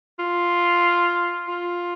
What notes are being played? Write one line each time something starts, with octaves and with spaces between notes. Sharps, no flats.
F4
F4